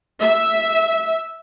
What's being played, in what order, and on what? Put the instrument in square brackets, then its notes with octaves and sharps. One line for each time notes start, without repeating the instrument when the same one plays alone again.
[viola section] E5